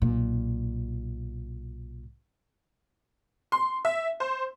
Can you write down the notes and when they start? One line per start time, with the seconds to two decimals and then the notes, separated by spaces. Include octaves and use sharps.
0.02 B1 A#2
3.52 C6
3.85 E5
4.20 C5